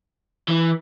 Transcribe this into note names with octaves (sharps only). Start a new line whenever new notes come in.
E3